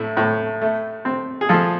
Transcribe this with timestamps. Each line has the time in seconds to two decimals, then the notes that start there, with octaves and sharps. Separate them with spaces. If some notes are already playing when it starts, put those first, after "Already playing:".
Already playing: A2 E4
0.17 A2
0.61 A3
1.05 C4
1.41 G#4
1.49 F3 F4 A4